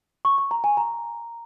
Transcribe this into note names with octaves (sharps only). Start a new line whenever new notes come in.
C#6
C#6
A#5
G#5
A#5